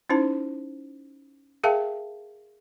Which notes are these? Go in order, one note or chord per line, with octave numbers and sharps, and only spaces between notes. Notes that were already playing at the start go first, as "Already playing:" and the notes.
C#4 D#4 E4 C5 A5
G#4 A#4 E5 F5 G5 A5